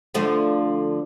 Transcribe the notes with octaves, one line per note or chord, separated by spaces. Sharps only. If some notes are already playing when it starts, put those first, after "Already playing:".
D3 F3 A3